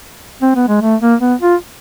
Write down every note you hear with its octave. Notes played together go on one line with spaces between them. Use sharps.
C4
B3
G#3
A3
A#3
B3
F4